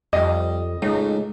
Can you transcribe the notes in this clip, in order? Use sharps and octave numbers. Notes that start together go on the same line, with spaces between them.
F2 G3 D#5
C#2 A2 C#3 G#3 D#4